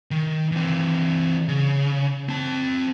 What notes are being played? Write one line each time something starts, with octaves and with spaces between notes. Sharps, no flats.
D#3
E3 C4
C#3
C4 A5